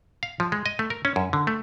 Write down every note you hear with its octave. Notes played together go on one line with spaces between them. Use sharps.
F5
F3
G#3
D#5
A3
A#4
C#4
F#2
D3
A3